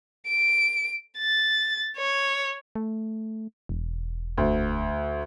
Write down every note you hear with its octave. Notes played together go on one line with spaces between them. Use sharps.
D7
A6
C#5
A3
E1
D2